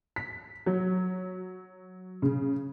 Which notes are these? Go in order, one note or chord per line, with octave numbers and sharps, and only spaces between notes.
B6
F#3
C#3